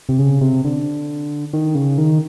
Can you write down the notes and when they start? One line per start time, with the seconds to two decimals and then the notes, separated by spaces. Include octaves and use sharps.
0.09 C3
0.19 C#3
0.41 C3
0.64 D3
1.53 D#3
1.75 C#3
1.98 D#3